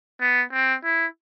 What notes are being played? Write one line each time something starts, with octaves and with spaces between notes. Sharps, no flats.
B3
C4
E4